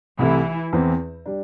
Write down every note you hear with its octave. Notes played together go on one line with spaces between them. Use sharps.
C2 C3 E3 A3 E4
E2 E3 C4 E4
G3 D4